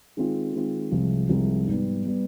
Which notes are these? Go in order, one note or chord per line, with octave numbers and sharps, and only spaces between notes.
D#3 G#3 C4 F4
D#3 G#3 C4 F4
C2 C3 F3 G#3 C4
C2 C3 F3 G#3 C4
G#2 G3 B3
G3 B3